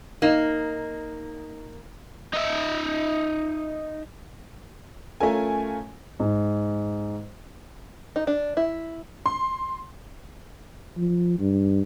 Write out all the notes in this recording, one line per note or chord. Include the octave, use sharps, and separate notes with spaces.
A#3 D#4
D#4 E5
A3 C#4 F4 A#4 G#5
G#2
D#4
D4
E4
C6
F3
G2